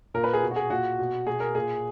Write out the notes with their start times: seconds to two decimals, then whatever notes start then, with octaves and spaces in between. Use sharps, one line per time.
0.14 A#2 A#4
0.24 B4
0.33 G#4
0.43 B2
0.51 F#4
0.56 G#4
0.70 A#2 F#4
0.99 B2
1.27 B2 G#4
1.40 A#4
1.55 A#2 G#4